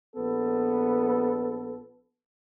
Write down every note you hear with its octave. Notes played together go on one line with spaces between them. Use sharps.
A#1 B3 A4 B4